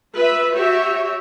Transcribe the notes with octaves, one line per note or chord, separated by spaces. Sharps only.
F4 B4 E5
F#4 G4 C#5 E5